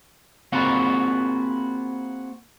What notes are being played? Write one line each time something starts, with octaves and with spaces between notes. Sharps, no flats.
A#3 C4 F4 F#4 G#4 B4